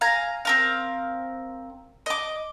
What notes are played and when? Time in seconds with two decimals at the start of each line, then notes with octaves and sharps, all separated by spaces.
0.01 F5 G#5 A#5
0.45 C4 A#4 F5
2.06 D#5 D6